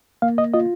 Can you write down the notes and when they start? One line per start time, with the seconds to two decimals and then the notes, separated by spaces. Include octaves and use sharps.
0.22 A#3 F5
0.38 D#5
0.54 F4 D#5